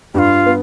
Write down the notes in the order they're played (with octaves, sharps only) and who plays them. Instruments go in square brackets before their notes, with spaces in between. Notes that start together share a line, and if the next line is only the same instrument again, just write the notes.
[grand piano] G2 [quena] F4 G4
[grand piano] B3